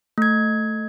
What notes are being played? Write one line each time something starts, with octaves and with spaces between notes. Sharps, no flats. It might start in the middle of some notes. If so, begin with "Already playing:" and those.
A3 G#6